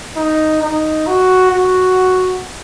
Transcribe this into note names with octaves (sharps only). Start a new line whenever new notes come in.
D#4
D#4
F#4
F#4